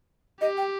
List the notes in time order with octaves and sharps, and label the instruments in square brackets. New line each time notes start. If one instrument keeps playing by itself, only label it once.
[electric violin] G4 [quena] D#5
[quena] G5